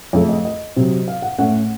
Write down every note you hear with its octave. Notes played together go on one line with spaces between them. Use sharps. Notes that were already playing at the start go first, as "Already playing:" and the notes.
F2 C#3 A3 C#5
D#5
D#5
C3 F#3 C4
F5
F#5
A2 A3 C#4 F#5